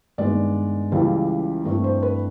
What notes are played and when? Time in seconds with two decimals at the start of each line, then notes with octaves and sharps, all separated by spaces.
0.18 G2 D#3 G#3 B3 D5
0.92 C#2 C#3 E3 G3
1.65 G2 E3 A3 C4
1.84 C5
2.03 B4